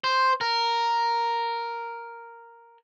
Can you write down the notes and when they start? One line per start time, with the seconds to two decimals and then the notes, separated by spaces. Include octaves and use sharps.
0.04 C5
0.41 A#4